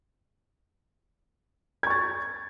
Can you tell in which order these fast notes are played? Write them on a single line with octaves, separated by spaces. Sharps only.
G#6 C#6 A6